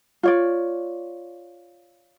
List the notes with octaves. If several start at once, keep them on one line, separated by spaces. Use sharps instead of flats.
F4 C#5 D5